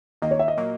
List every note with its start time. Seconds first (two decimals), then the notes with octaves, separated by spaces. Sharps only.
0.22 D#2 D#3 A#3 D#5
0.31 C#5
0.39 E5
0.48 D#5
0.57 A#2 F#3 A#3